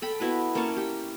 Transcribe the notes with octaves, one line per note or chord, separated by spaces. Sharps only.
A4 G5 B5
B3 E4 F#4 B4
A#3 C#4 A5 C#6
G4